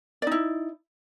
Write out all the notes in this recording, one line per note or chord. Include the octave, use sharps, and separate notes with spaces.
D#4 E4 D5